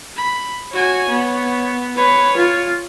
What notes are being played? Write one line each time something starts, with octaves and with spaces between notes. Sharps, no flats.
B5
F#4 C#5 G#5
B3
B4 C#5
F4